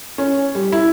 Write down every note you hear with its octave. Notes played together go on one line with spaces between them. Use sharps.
C#4
G3
E4